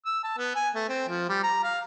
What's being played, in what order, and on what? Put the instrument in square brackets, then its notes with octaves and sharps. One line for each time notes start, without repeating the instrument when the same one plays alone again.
[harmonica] E6
A5
B3
G#5
A3
C4
F3
G3
A#5
F5